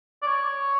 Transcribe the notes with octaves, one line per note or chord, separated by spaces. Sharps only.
D5
C#5